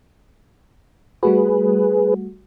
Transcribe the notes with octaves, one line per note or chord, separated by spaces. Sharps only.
G3 A3 F#4 G#4 B4